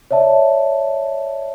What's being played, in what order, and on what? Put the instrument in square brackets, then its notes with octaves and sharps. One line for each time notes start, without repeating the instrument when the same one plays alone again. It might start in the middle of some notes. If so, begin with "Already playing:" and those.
[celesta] C#5 D5 E5 A5